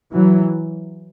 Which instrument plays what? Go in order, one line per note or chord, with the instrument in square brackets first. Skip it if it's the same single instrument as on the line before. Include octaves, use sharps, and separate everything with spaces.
[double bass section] E3 F#3